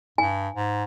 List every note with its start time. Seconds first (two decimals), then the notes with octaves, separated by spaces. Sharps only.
0.18 G2 G#5
0.55 G#2